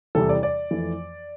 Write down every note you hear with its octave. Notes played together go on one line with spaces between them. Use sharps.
E2 C3 E3 G3 A4
D5
D5
F2 E3 A3